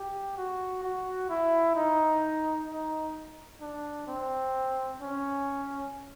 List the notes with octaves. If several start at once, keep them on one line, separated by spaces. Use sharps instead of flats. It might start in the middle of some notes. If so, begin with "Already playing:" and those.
Already playing: G4
F#4
F#4
E4
D#4
D#4
D4
C4
C#4